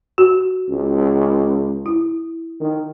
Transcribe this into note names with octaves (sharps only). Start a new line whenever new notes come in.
F#4
C#2
E4
D#3